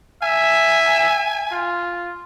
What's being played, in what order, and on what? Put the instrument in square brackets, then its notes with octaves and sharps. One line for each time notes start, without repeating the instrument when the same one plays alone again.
[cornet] E5 [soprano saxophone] G#5
[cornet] F4